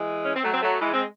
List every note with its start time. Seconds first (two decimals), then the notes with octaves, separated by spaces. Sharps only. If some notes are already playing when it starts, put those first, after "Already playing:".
Already playing: E3 G#3
0.25 C#4
0.35 C4
0.44 F#3 A3
0.54 C4
0.63 F#3 A3
0.81 E3 G#3
0.94 G#3 C4